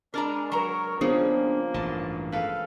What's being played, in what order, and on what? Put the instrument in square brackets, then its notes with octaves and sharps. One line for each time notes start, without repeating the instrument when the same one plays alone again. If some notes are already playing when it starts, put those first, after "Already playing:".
[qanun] G#3 A5 C6 [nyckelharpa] D4 [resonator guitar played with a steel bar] A#4 D5 A#5
[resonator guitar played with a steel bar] F#3 A#5 [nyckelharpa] A#4 C#5
[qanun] C#3 F3 G3 [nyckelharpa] A#3 [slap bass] B3 D4 [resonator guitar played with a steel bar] G#4
[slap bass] A1 G2 [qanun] D#5 A5
[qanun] G#3 A4 B4 [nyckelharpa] F5